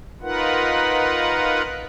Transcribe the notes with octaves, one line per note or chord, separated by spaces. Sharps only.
D#4 F4 A#4 B4 F#5